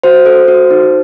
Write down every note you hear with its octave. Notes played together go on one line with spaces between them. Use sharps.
F#4 C5
A4
F#4
D#4